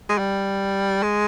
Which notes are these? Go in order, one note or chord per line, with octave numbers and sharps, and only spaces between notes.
G#3
G3
G#3